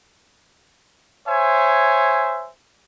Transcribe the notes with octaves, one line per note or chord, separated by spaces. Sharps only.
C5 C#5 E5 G#5